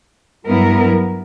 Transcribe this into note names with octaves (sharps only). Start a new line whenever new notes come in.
G2 F#3 B3 E4 A#4